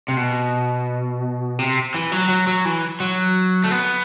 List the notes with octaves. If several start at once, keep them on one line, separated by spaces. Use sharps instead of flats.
C3
B2
C3
E3
F#3
F#3
F#3
E3
F#3
A3
B3